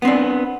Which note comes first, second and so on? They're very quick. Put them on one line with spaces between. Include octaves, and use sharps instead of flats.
B3 C4 D4